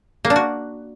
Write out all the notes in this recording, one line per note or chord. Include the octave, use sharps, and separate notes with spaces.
A#3
D4
F#4